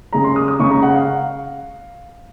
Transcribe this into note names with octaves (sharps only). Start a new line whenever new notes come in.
C#3 G#3 A#5
C6
D#6
D#6
C#3 G#3 C#6
A#5
F#5
F5